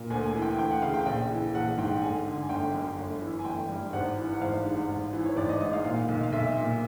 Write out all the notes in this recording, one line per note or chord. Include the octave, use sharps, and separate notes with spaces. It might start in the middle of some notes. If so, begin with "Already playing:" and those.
Already playing: A#2
D2 G#5
G#5
E3
G5
D2 G5
F#5
C#3 F5
G5
A#1 G5
E3
A#1 F#5
G#2 G5
G1 G#5
D3
G#5
G1 G5
F#2
G1
E3
G#5
G1 G5
G2
G#1 F#5
E3
F#5
G#1 F5
G#2
G#1
E3
C#5
G#1 D5
D#5
G#2 D#5
F5
A#2 F5
B1
F5
B1 E5
A#2